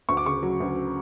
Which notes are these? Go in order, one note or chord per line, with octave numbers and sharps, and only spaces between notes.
D2 C#6
D6
C#3 C#6
F#3
D2